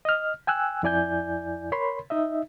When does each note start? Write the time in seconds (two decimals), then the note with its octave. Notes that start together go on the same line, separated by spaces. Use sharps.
0.05 D#5 F6
0.47 G5 G#5 E6 F#6
0.83 F2 E4 D5 G#5 G6
1.72 A#4 C#5 B5 C6
2.10 D#4 D#5 E5